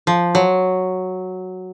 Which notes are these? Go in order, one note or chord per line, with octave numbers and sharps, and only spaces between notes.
F3
F#3